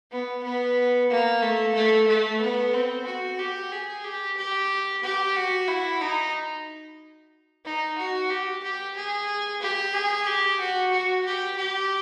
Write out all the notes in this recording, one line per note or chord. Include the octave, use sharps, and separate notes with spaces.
B3
B3
A#3
A3
A3
A3
B3
C4
F#4
G4
G#4
G4
G4
G4
F#4
E4
D#4
D#4
F#4
G4
G4
G#4
G4
G#4
G4
F#4
F#4
G4
G4